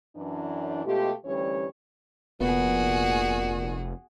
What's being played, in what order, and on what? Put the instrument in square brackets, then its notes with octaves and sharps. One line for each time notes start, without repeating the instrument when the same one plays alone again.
[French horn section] F#2 E3 D4
B2 G#3 A3 F4 G4
D2 E3 G3 C#4 G4 C#5
[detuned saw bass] F1 [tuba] A#2 [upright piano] B3 [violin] F#4 G#4